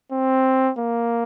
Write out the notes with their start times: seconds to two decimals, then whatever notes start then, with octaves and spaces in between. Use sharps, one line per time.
0.12 C4
0.78 A#3